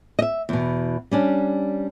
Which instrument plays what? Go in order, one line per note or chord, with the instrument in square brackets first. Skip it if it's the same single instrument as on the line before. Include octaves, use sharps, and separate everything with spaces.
[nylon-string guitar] D#5 E5
E2 B2
G3 C#4 D4